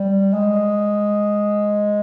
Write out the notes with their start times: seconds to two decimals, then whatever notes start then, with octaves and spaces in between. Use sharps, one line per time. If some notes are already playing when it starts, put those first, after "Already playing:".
Already playing: G3
0.34 G#3